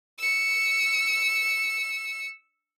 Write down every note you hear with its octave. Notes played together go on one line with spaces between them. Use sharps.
E6 C#7